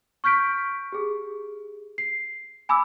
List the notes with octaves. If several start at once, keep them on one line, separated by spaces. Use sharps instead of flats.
C#6 F6 G6 B6 D7
G4 G#4
C7
G#5 B5 D6 E6